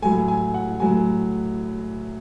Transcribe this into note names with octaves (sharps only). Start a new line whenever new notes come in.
A2 F#3 A3 G#5
G#5
F#5
A2 F#3 A3 G#5